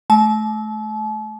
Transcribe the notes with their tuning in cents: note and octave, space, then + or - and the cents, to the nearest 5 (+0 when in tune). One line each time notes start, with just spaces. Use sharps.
A3 -25 A5 -40